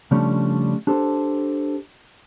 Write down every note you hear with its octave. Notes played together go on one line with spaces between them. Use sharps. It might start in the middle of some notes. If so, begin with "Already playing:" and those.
C#3 F3 G3 A3 C#4 D4
D4 G4 A4 C5